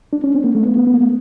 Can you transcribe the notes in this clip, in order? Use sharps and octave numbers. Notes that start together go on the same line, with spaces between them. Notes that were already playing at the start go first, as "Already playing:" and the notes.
D4
C#4
C4
A#3
A3
B3
B3
B3
A#3
A3